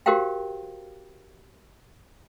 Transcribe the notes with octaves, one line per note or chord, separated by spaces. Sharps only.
F#4 G4 A#4 C5 F5 G5